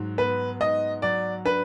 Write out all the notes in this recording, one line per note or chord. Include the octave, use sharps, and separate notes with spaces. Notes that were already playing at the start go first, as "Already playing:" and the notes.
Already playing: G#2 F#3
B3 B4
G#2 D#5
F#3 D5
D4 B4